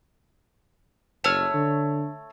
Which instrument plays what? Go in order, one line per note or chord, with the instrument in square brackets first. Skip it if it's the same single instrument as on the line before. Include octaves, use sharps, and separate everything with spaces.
[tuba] F#1 [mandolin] A3 C#5 F6
[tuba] D3